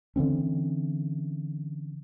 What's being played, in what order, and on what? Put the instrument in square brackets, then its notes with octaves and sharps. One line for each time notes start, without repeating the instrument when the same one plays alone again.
[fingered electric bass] D3 E3 C4 C#4